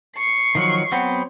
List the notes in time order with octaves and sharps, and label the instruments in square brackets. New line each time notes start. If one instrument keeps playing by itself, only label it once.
[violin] C#6 C7
[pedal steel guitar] D#3 F3 F#3
F#3 B3 C4